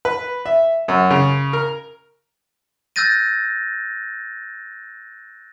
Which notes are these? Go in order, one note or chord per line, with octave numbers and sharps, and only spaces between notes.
B4
E5
F#2
C#3
A#4
E6 F#6 G6 A6 A#6 D#7